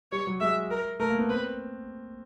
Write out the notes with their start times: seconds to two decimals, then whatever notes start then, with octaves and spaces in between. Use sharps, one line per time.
0.12 G3 C#5
0.27 F#3
0.40 G#3 E5
0.70 A#4
1.00 A3 A#4
1.09 A#3
1.19 B3
1.29 C4 B4